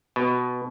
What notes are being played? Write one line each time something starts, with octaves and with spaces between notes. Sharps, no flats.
B2